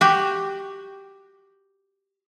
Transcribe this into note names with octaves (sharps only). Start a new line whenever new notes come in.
F#4 G4